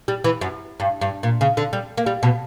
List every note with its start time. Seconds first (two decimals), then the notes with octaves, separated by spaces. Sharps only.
0.08 G3
0.24 E3
0.41 F#2
0.80 G2
1.01 G2
1.23 A#2
1.41 C#3
1.57 D3
1.73 G3
1.97 A#3
2.06 G3
2.23 B2